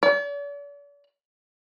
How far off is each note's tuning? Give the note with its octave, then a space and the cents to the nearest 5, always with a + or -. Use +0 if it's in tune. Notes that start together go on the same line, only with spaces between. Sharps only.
D5 -45